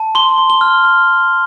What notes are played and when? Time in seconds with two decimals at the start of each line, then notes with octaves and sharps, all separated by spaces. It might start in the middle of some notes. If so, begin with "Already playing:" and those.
Already playing: A5
0.15 C6 G7
0.38 C6
0.50 G7
0.61 F6
0.85 F6